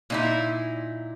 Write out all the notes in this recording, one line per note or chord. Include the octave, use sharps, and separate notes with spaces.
A#2 D#4 E4